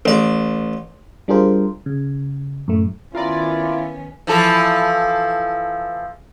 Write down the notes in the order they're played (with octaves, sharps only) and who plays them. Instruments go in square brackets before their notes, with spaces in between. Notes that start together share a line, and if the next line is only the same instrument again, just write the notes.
[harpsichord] A1 D5
[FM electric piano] G3 D4 F4 G#4 A#4 C5
C#3
F#2 A2 A3
[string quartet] D#3 B3 C#4 [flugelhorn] E4 [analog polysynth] F4 A#4 D5
[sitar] E3 F3 A4